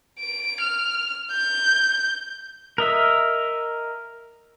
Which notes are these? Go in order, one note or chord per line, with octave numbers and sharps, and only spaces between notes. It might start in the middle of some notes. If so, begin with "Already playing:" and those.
D7
F6
G6
A#4 D#5 E5